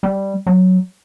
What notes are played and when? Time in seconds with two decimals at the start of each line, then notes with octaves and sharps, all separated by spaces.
0.03 G3
0.47 F#3